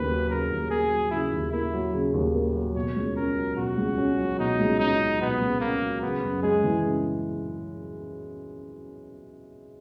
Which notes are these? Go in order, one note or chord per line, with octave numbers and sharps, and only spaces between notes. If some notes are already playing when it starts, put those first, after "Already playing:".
Already playing: D#2 C#3 A#3 B4
F#3
C#3 A#4
D#2
A#3 G#4
F#3
C#3 E4
D#2
A#3 E4
F#3
C#3
D#2
A#3
F#3
B2 C#5
C#2
C#4 A#4
F#3
B2 F#4
C#2
C#4
F#3
B2 D#4
C#2
C#4 D#4
F#3
B2 B3
C#2
A#3 C#4
F#3
C#3 B3
F#2
G#3 G#4
E3
C#3